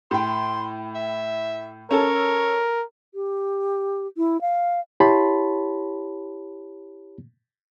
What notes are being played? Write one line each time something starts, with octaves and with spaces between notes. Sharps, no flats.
A2 G5 C6
E5
C#4 A4 A#4 C#5 A5
G4
E4
F5
E4 G4 C#5 A5 B5 C6